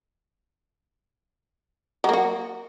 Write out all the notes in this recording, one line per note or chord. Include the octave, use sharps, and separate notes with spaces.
F#3 A#3 F#4